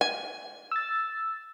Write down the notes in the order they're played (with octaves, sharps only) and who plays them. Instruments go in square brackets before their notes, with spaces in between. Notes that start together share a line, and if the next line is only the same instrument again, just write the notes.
[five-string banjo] G#5
[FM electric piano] E6 A6